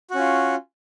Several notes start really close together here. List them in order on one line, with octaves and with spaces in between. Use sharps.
F#4 C#4 F4